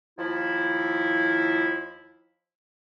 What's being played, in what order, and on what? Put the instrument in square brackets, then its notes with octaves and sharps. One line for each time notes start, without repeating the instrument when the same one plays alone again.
[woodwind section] D#2 F3 E4